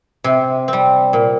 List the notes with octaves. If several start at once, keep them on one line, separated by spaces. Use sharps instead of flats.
C3
G3 C4
A#2